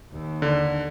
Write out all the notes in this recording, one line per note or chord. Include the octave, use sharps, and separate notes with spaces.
D#2
D3